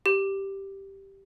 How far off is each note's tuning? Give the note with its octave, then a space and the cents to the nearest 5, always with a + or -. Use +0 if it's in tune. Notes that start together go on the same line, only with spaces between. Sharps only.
G4 -5